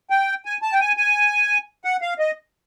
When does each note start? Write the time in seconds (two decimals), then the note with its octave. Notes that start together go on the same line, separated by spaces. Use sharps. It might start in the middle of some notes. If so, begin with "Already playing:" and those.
0.10 G5
0.45 G#5
0.62 A5
0.72 G5
0.80 G#5
0.97 G#5
1.85 F#5
2.02 F5
2.19 D#5